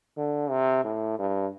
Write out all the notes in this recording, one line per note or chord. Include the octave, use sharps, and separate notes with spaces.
D3
C3
A2
G2